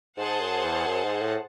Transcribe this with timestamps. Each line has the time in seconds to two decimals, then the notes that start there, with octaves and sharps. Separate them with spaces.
0.17 G#2 G#4 C5 F#5 A5
0.41 F#2
0.64 E2
0.86 F#2
1.04 G#2
1.22 A2